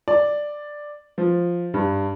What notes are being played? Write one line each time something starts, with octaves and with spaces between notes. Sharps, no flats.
D5
F3
G2